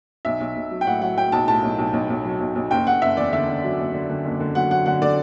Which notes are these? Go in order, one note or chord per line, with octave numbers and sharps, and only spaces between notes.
B1 E5
B1
B1
F#3
G5
A2 F#5
F#3 F#5
F#3 G5
B1 A5
A2 A5
B1
B1
B1
B1
F#3
B1
B1
F#1 G5
F#1 F#5
F#1 E5
E2 D5
D3 E5
F#1
F#3
F#1
D3
D3
F#1
D3
F#3 F#5
F#3 F#5
D3 F#5
D3 D5